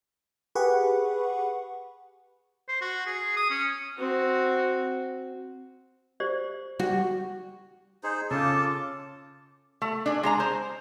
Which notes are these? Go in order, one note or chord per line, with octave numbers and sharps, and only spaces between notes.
G4 G#4 B4 F#5 B5 C#6
C5
F#4
G#4
D#6
C#4
C4 F#4
G4 C5 D5
G3 F#4
D#4 G#4 C5
C#3 F4 A4 A5 D6
A3
D4 G#4
G#3 G#4 A#5
C5